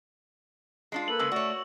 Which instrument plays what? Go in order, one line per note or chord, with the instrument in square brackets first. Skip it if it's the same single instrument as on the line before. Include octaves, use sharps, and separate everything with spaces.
[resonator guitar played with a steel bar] G#3 D4 F4
[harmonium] A#3 A4 B4 [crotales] F#7
[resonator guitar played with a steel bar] C#3 G#3 [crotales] E6
[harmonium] A3 D5 [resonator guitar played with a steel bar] F#4 C#5